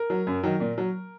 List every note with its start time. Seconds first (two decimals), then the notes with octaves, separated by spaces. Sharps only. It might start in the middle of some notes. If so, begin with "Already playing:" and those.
Already playing: A#4
0.10 F#3
0.27 F#2
0.43 D#3 F#3
0.60 A#2
0.78 F#3